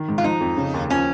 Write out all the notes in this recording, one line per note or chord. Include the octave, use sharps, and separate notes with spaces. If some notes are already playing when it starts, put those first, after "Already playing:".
Already playing: D#3
G#2
F4
F3 D#4
F2
C#3
D#2
F3 C#4